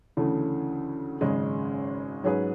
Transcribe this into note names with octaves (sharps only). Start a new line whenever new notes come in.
D2 C#3 E3 A3
G#1 F#2 C#3 G#3
G#2 F#3 C#4 G#4 B4